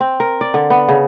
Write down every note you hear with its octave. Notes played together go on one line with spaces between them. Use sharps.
C4
A#4
D5
D3
B3
C#3